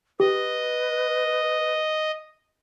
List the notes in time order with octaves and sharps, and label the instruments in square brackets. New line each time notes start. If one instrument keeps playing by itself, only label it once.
[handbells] G4 [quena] B4 [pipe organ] D#5